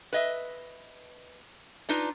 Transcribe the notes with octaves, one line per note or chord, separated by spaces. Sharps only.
B4 D#5 E5
D4 D#4 F4 B4